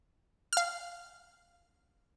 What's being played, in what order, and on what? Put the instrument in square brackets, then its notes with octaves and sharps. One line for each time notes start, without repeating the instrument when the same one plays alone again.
[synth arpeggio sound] F5 F6